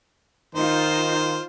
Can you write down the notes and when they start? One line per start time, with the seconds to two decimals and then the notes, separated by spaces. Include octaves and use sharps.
0.55 D#3 D#4 F4 C5